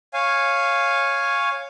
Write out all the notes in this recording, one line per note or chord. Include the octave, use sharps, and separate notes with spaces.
C#5 F5 G#5